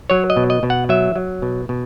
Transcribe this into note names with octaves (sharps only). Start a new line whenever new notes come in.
F#3 C#5
D#5
B2
D#5
B2
F#5
F#3 E5
F#3
B2
B2